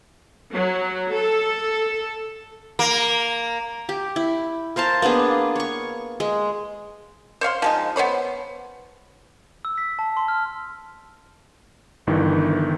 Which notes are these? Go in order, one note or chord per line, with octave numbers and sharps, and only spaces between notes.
F#3
A4
A#3
G4
E4
A#4 C5 F5 A5
A#3 B3 D4 G#4
C#5 C#6
G#3
C5 C#5 F5 C6
F3 G#3 D#4
B3 C5 C#5 B5
E6
B6
A5
C6
F6
G1 G2 D#3 E3